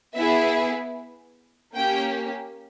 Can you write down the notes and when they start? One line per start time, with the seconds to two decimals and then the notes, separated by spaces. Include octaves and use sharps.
0.16 B3 E4 G#4 E5
1.74 A#3 C#4 G4 G5